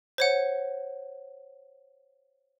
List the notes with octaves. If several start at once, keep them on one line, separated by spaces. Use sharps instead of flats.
C5 C#5 F#5